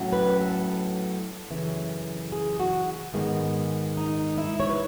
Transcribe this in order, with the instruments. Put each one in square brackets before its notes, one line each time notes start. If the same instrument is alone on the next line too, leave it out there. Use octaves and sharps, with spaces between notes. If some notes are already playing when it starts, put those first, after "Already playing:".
Already playing: [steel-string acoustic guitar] A2 F#3 C#4
B4
A4
F#2 C#3 E3
G#4
F#4
G#2 D#3 G#3 B3
D#4
E4
C#5
B4